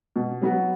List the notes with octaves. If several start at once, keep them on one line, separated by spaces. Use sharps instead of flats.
B2
F#3 B3 F#4